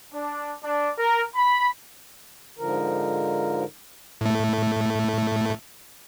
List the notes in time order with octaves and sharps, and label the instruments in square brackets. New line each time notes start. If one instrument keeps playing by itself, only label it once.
[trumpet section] D4
D4
A#4
B5
[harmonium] G#2 D3 F3 A#4
[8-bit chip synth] A2 A3